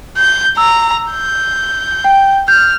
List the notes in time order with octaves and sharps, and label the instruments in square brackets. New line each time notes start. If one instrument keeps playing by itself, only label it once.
[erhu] G6
[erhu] A#5 [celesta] E6
[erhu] G6
[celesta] G5
[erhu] F6 [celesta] G6